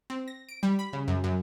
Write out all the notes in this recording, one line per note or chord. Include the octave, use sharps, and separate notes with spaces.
C4
A#6
D7
G3
B5
C#3
F#2
F#2